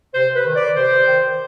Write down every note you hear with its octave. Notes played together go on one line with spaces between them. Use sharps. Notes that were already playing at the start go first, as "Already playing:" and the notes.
C3 C5
B4
D#3
D5
C3 C5
D#3